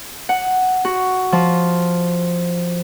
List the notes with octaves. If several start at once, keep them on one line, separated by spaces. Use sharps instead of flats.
F#5
F#4
F3